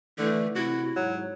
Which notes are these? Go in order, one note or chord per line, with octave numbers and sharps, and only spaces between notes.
D3 E3 A3
C3 E4 F#4
G#2 F#3